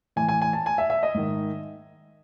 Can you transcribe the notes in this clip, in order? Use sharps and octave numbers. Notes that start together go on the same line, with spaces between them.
A2 E3 G#5
G#5
G#5
A5
G#5
E5
E5
D#5
G#2 D#3